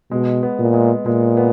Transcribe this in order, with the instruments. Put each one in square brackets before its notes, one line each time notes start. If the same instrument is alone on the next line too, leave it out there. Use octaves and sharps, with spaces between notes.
[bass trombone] B2 [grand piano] G#3
[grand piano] B3
[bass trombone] A#2
[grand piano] G#3
[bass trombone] A#2 [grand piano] G#3
[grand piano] B3